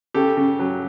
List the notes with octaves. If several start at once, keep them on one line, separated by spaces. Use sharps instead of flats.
C#3 G4 A4
C#3
F#3